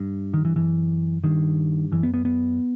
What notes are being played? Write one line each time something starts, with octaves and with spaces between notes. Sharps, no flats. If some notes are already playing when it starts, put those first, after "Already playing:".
Already playing: G2
D#3
E3
F#2 E3
G2 D#3
F#2 E3
B3
B3
B3